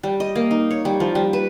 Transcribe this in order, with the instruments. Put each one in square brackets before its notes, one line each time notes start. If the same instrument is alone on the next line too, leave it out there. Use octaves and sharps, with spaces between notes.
[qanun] G3
D#5
A#3
D#4
C#5
G3
F3
G3
B4